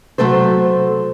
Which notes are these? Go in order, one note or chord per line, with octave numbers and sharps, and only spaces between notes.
C3 F#3 A3 A4 C5